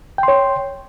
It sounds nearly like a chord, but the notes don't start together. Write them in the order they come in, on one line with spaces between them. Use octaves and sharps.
G5 C6 C#5